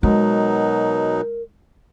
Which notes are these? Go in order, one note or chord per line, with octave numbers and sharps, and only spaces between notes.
B2 F#3 G#3 D#4 A#4